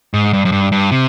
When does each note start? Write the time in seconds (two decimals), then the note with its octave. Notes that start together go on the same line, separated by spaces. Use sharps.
0.14 G#2
0.33 G2
0.45 F#2
0.52 G2
0.72 G2
0.91 C3